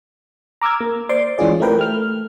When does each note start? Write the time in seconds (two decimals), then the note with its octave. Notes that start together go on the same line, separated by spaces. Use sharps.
0.62 A#5 D6 E6 F6 G#6
0.81 A#3
1.09 C5 D5 C6 D6
1.38 E3 G#3 C#4 F4 G#4 D5
1.60 A3 C4 G4 A#4 B4 G5
1.78 A3 F6